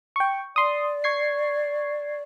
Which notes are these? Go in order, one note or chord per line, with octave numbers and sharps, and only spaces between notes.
G5 C#6
D5 C6 D#6
C#6 G#6 C7